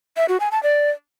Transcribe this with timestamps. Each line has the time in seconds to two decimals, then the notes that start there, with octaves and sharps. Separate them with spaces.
0.17 E5
0.29 F#4
0.40 G#5
0.52 A5
0.63 D5